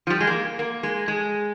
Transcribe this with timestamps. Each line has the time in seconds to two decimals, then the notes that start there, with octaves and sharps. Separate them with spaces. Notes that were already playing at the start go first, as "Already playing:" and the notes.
0.07 F3
0.10 G3
0.21 G#3
0.27 A#3
0.59 A#3
0.83 G#3
1.08 G#3